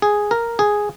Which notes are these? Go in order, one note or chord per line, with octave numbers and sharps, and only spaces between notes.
G#4
A#4
G#4